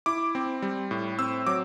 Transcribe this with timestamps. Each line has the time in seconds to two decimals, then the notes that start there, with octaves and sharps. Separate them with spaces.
0.06 E4 D6
0.35 C4
0.62 G3
0.91 A2
1.19 C4 E6
1.46 F#3 D6